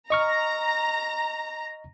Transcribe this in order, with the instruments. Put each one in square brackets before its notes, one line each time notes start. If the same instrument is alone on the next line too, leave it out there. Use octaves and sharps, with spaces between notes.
[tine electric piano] D#5 C#6 F6 [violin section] A#5